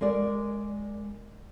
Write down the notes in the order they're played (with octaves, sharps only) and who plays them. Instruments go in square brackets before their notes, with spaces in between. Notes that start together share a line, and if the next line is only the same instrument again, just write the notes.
[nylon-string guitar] G#3 A#4 D5